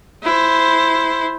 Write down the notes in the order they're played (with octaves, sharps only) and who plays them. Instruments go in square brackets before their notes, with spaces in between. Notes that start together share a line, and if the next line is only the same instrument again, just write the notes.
[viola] E4 C5